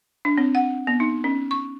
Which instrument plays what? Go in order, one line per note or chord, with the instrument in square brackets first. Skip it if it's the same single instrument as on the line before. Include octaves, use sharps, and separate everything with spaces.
[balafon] D4
C4
F#5
B3
D#4
C#4
C#6